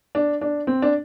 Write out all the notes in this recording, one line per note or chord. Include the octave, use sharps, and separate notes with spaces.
D4
D4
C4
D4